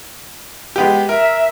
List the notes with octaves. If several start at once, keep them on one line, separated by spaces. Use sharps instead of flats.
G#3 B3 G4
A#4 E5